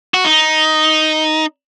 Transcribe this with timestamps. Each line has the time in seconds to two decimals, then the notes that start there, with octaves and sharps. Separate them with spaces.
0.14 F#4
0.24 D#4